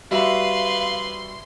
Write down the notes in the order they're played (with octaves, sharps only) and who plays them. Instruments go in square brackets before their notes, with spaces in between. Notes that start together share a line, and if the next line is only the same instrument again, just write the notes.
[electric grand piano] G3 F#4 E5 [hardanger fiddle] B4 [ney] F5 [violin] C6